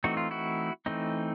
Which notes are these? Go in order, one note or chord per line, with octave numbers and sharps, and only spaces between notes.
E3 A3 C4 D#4 F#4
F4
E4 F#4
E3 A3 C4 D#4